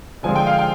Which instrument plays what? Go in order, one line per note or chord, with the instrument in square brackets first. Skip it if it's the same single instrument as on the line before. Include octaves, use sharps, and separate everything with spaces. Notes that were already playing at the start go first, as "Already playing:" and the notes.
[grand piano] D3 F3 G#3 C4 [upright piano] G#5
[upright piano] G5
F5
G5